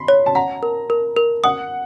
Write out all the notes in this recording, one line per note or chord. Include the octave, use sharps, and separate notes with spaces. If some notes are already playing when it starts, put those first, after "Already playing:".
Already playing: B5 C6
C#5
A5
F#5 A#5
A#4
A#4
A#4
F#5 D#6